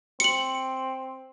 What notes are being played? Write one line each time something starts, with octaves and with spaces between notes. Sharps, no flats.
C4 C#7 F#7